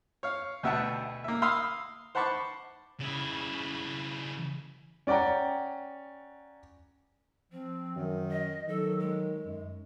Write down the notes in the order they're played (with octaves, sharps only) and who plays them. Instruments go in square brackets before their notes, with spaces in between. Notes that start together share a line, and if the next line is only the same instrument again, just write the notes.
[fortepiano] C#5 F5
D2 B2 E5 F#5 G5 A5
A#3 E5
F5 B5 C6 D#6 E6
C5 F#5 A5 B5 C#6 D6
[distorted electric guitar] C#3 E4
[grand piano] C#4 D5 F#5 G5 A#5
[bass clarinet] F3 [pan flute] C4
[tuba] F#2 [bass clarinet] D#3
[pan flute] D#5
[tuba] D#3 [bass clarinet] F#3 [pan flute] A4
[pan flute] G#3
[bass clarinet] F#2